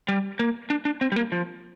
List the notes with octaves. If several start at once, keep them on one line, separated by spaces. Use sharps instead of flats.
G3
A#3
D4
D4
C4
G3
A#3
F3